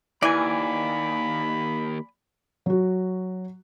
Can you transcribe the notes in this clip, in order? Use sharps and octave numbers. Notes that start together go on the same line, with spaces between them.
D#2 E3 D5 G#5 B5
F#3 F#4